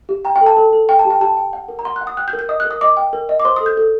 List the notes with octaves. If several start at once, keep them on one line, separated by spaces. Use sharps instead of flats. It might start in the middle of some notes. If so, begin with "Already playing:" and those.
G4
G5 A#5
G5
A4
A5
A4
A4
G5
A5
G4
G5
G4 A5
G5
F#5
A#4
A#5
F#5 C6
F#6
F#5
D#6
G5 F#6
G6
A#4
G6
D#5 D#6
F#6
A#4
D#6
D#5 D6
G5
A#4
D#5
D6
C5 C6
D#6
A4
G6
A4